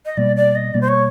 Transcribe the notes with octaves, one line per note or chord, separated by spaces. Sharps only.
D#5
B2 G3 A#3 D5
D5
D#5
B2 G3 A#3 D5
C5
C#5